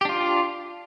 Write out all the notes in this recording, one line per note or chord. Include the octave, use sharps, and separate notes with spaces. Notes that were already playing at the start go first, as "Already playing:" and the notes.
D4 F4 G4